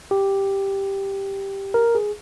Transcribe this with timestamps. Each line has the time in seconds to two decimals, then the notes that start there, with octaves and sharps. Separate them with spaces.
0.11 G4
1.74 A#4
1.95 G#4